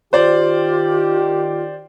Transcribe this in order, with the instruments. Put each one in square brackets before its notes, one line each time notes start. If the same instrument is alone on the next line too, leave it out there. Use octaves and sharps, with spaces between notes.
[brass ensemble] D#3 G4 [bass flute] F4 [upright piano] C5 D5